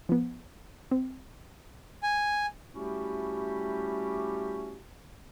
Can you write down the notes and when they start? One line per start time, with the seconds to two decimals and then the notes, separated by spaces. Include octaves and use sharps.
0.09 F3 B3
0.91 C4
2.03 G#5
2.74 G3 A3 C#4 E4 F#4 G4